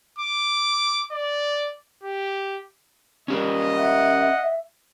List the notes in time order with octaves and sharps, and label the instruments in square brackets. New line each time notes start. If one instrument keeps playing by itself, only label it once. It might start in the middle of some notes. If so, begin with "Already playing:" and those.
[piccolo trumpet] D6
D5
G4
[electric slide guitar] C#4 G4 A#4 [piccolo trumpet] D#5
[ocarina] E5 [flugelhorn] F#5